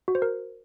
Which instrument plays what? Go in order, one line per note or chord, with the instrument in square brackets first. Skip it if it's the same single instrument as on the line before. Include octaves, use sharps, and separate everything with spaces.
[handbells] F#4
C5
A#4